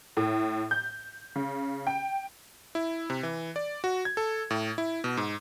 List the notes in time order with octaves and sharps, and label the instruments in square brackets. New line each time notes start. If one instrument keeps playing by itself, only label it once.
[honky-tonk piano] A2
G6
C#3
G5
[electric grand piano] E4
C3
E3
D5
F#4
G#6
A4
A2
E4
B2
G#2